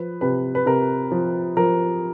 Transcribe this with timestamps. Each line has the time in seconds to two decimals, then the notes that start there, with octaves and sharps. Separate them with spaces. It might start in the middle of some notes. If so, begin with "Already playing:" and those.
Already playing: F3 B4
0.21 C3 B4
0.55 B4
0.66 C3 A#4
1.12 F3
1.57 F3 A#4